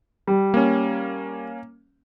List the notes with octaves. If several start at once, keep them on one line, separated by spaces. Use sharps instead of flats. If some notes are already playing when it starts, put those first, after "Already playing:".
G3
A#3 C#4